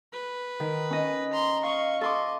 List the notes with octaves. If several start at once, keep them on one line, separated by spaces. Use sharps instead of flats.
B4
D#3
C#4 D#5
A#5 C6
D#5 F5 C#6
A4 D#5 C6 D6